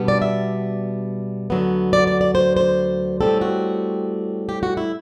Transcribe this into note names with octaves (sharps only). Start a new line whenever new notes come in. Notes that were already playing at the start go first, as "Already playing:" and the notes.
Already playing: B2 G3 B3 D4
D5
E5
D2 D3 F#3 B3
D5
D5
D5
C5
C5
A2 G3 C4 A4
F#4
G4
F#4
E4